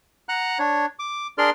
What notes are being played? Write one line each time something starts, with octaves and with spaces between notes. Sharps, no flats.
F#5 A#5 F#6
D4 C#5
D6
D4 G#4 A#4 D5 C6 F6